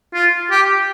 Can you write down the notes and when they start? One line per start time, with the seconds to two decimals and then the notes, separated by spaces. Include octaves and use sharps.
0.14 F4
0.51 G4